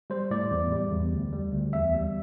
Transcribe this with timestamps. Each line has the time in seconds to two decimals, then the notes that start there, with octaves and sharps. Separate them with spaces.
0.10 G3 C5
0.31 A2 D5
0.51 E2
0.72 G3
0.92 E2
1.13 D2
1.33 G3
1.53 D2
1.73 E2 E5
1.94 G3